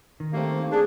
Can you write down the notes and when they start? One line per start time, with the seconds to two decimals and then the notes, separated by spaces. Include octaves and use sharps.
0.20 D#3
0.33 G3 A3 A#3 C4
0.72 D4 G#4